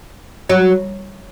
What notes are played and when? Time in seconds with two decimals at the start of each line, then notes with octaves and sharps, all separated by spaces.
0.50 F#3